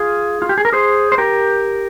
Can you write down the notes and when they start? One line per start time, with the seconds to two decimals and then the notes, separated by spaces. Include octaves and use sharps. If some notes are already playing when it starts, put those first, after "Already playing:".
Already playing: F4 G#4
0.42 F4
0.49 G4
0.58 G#4
0.65 A#4
0.72 G#4 C5
1.12 C5
1.18 G4 A#4